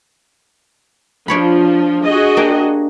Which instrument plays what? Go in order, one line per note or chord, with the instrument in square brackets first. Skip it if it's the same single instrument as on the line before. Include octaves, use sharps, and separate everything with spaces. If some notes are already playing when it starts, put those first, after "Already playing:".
[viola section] F3 [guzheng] D4 C#5 B5
[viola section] F#4 G#4 D#5
[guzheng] A#3 D4 G4